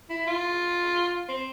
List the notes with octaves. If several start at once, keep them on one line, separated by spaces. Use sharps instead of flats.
E4
F4
C4